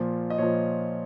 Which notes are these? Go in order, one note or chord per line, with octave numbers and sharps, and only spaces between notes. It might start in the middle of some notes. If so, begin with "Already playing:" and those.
Already playing: A#2 F3
D#5
A#2 F3 C#5